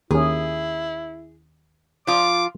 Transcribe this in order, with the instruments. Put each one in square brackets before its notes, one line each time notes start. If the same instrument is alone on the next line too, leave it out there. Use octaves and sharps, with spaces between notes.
[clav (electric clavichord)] D#2 C#4 [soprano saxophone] E4 [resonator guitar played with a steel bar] G#4
[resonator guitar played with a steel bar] F3 F4 [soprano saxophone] D6